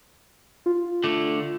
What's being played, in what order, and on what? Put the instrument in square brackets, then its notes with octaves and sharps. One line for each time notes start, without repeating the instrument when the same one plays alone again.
[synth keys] F4
[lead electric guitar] D3 A3